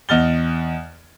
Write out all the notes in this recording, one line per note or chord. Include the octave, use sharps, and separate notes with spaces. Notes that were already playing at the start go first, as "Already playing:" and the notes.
E2 D#5 F#5 F6 A6 G7